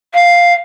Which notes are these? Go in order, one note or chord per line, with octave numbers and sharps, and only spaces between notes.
F5